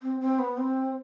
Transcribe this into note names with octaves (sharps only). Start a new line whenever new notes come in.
C4
C4
B3
C4